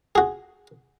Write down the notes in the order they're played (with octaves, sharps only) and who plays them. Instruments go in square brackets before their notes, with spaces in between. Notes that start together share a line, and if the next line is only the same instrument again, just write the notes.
[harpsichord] F#4 G#4